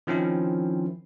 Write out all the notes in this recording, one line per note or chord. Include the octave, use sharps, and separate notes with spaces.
D#3 F3 C4 C#4 E4